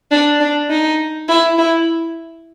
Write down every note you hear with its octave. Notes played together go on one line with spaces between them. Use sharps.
D4
D4
D#4
E4
E4